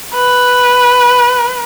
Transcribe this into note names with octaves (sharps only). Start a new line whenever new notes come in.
B4